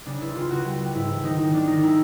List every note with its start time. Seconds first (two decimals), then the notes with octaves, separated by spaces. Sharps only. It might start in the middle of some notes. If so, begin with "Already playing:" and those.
0.06 C#3 D4
0.21 C#2 E4
0.35 C#3 F4
0.50 C#2 F#4
0.65 G3
0.80 G3
0.95 G#2 E4
1.09 E3
1.24 D#3 D#4
1.38 D#3 D#4
1.53 D#3 D4
1.67 D#3 D#4
1.82 G#3 E4